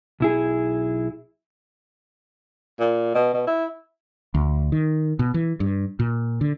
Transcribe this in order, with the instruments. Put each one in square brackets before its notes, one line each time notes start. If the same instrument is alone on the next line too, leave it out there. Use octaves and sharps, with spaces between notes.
[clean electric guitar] B1 E4 G#4
[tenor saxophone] A#2
B2
B2
E4
[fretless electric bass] D2
D#3
B2
E3
G2
A#2
D3